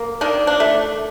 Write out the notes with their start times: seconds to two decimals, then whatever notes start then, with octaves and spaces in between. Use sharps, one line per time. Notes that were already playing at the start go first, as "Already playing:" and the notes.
Already playing: A#3
0.21 D#3 D4
0.47 D4
0.60 A3